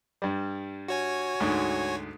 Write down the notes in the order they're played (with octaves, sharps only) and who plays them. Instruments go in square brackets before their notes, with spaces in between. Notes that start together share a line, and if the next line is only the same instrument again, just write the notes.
[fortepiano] G2 G3
[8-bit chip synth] F#4 C#5 G#5
[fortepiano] D2 G#2